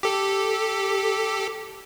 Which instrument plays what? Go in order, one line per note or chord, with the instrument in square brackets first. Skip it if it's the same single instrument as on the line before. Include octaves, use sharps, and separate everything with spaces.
[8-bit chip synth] G4 A4